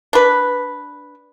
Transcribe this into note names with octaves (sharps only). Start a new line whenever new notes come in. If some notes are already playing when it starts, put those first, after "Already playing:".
D4 B4